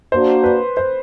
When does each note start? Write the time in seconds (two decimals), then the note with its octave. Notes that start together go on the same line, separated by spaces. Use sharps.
0.12 A#3 D4 F#4 C5
0.44 B4
0.77 C5